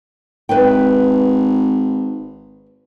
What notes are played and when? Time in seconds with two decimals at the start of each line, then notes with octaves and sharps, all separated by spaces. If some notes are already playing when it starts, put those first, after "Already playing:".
0.49 G#1 B4 E5 G5